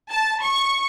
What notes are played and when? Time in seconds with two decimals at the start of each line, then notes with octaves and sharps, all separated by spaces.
0.11 A5
0.43 C#6